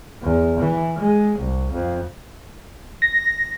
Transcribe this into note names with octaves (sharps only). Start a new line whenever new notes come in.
E2
E3
G#3
C2
F2
A#6